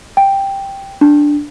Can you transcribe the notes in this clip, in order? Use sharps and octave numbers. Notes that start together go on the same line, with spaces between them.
G5
D4